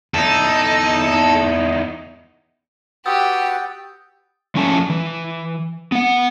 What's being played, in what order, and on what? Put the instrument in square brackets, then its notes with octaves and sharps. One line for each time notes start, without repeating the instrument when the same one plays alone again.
[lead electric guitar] E2 D#4 [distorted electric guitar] A4
[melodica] F#4 B4 F#5 [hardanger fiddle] G4 [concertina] G5 [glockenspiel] D#6 E6 A6
[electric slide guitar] F3 A3 C#4 G#5 A5
E3
B3 F#5